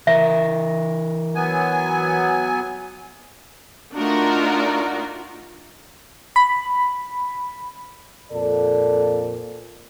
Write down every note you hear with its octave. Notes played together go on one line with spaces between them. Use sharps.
E3 A#4 E5
F#3 B3 G#5
A3 D4 D#4 F4 F#4 A#4
B5
F2 A#2 A4 D5